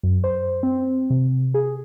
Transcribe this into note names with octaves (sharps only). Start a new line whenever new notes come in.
F#2
C5
C4
C3
G#4